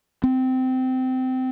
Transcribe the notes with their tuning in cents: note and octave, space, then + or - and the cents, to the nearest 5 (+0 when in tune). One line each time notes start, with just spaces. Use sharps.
C4 -20